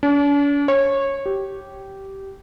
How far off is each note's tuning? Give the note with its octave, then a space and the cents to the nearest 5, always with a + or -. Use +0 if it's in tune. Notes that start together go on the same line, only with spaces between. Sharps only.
D4 -45
C#5 -20
G4 -15